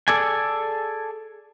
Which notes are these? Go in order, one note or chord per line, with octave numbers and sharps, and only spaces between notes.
G#4 A4 D5 G#5